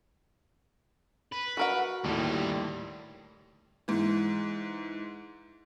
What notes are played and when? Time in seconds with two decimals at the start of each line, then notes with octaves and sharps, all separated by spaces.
1.32 B4
1.57 F#4 A#4 F#5
2.04 D#2 A2 D3 G3
3.88 G#2 E3